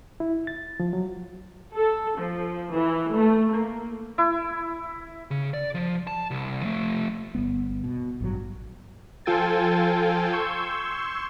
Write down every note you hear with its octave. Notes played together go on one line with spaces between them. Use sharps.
E4
A6
F3
F#3
A4
F3
E3
A3
A#3
E4
C#3
D5
F3
A5
C2
F3 A3
G1 G3 B3
B2
A1 G2 F#3
F3 F4 A4 G5 G#5 A6
C6 C#6 E6 G6 G#6